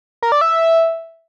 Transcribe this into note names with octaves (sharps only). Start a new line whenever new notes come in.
A#4
D5
E5